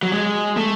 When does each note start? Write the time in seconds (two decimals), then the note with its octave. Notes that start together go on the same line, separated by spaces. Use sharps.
0.03 F#3
0.13 G#3
0.57 A3